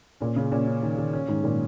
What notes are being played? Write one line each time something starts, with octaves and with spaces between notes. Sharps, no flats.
A#2 C#4
C#3 C#4
A#2 C#4
C#4
D#3
D#3
C#4
G#2 D#3
A#2 D#3